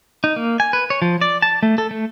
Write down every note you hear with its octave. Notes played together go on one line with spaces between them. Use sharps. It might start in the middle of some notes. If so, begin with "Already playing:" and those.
D#4
A#3
G#5
B4
C#5
F3
D5
A5
A3
A4
A3